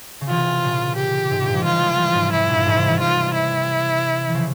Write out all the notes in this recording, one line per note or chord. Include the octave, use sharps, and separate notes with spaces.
C#3
C3 E3 F4
A#2 C#3
G4
G#2 C3
G2 A#2
F3 G#3
E3 G3 F4
F3 G#3
E3 G3
G#2 C3
F2 G#2 E4
G2 A#2
F2 G#2
C3 E3
E3 G3
C3 E3 F4
E4
E3
C#3 F3